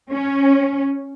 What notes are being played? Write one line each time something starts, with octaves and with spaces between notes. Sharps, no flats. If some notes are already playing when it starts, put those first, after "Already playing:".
C#4